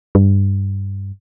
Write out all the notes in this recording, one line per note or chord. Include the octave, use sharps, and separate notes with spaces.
G2